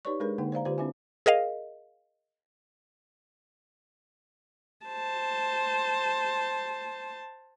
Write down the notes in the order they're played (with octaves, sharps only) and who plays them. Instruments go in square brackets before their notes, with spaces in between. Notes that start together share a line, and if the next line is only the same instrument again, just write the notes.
[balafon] D#4 G4 B4 C#5 D5 C#6
G#3 D4 G#4 A#4 B4
D3 A#3 D#4 F#5
C5 D5 F5 A#5
D3 F4 G4 B4 C5 D5
C4 D4 E4 E5 G#5
[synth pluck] G#4 A#4 D#5 F5
[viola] C5 A5